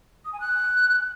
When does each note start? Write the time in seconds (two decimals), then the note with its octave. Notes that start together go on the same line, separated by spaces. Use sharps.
0.25 D#6
0.33 G#5
0.40 F#6